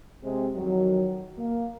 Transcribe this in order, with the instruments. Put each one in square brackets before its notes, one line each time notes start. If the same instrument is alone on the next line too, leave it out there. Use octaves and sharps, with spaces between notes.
[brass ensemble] C3 G#3 C4
F2 D#3 F#3
A#3